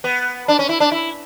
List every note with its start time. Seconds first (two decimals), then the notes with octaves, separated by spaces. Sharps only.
0.04 B3
0.48 D4
0.59 C#4
0.69 E4
0.80 D4
0.92 E4